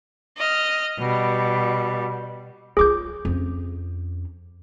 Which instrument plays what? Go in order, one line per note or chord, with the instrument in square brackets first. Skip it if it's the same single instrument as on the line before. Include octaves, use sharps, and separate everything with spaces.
[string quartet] D#5 F6
B2 G3
[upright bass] F#3 F4 [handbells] G#4 D6 G6
[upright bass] F2 C#4